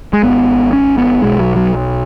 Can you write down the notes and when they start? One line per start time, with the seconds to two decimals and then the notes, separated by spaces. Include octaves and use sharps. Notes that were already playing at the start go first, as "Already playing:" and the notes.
0.13 G#3
0.23 G#1 G#2 B3
0.73 C#4
0.98 B3
1.22 B1 B2 G#3
1.39 F#3
1.56 F#3